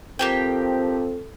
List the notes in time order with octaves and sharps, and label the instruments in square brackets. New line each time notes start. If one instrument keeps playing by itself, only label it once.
[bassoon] F3 [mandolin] A#3 G4 G5 [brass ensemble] C4 A4